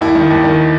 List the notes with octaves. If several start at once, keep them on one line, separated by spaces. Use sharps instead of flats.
D#2 E4
D#3
D#2
D#3